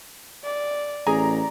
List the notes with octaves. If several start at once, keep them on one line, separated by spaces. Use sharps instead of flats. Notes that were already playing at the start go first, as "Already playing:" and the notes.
D5
A1 G#4 D5 A#5